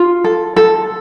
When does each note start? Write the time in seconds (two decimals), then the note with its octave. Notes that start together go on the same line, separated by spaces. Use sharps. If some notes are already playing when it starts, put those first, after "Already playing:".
Already playing: F4
0.24 A4
0.56 A4